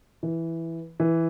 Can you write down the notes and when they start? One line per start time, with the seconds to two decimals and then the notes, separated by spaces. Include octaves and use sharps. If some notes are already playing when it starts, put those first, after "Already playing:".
0.23 E3
1.00 E3